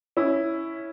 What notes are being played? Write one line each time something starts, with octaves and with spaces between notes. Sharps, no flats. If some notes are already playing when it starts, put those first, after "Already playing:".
C#4 E4